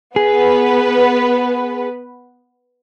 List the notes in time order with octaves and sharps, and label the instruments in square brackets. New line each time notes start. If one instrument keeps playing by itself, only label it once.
[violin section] B3 B4 [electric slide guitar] G#4